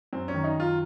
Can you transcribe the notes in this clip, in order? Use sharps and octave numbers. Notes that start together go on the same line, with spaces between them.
F#2 C4
C#4
D#3
D#4
F#2 F4